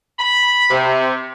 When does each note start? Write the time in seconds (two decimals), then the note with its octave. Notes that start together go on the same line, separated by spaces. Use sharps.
0.18 B5
0.70 C3